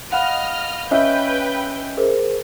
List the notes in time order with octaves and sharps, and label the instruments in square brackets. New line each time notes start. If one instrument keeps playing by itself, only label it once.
[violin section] D#5 F6 [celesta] F5 B5 [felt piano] F#5
[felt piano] C#4 D#5 E5 [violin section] B4 G5 G6
[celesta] G#4 A#4 C5